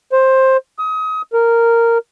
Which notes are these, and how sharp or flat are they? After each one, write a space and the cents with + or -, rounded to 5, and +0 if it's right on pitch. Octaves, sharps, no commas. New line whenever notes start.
C5 +15
D#6 +30
A#4 -10